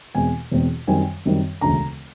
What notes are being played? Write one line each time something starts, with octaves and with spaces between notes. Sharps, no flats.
E2 B2 G#3 C4 G#5
E2 B2 G#3 C4
F#2 D#3 G3 C4 G#5
F#2 D#3 G3 C4
E1 D2 C#3 A#5